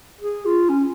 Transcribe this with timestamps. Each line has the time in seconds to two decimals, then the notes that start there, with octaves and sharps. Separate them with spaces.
0.21 G#4
0.45 F4
0.70 C#4